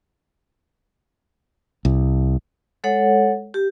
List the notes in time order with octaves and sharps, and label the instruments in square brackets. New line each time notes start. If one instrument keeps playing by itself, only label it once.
[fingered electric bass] C2
[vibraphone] G#3 A4 C#5 F#5
G4